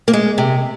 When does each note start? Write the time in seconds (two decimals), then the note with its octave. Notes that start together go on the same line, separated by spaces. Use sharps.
0.08 A#3
0.13 G#3
0.38 C3